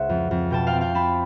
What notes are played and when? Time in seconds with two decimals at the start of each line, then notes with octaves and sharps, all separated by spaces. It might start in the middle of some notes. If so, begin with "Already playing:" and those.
Already playing: C#2 C5 E5 F#5
0.09 F2
0.31 F2
0.50 B2 G5 A5
0.67 F5 G5
0.73 C4
0.81 F5 G5
0.95 C4 A5 B5